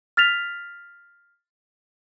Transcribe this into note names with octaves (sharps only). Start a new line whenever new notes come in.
F6 A6 B6 F7